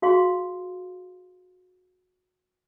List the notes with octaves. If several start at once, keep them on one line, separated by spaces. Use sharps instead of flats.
F#4 G#4 F5 C6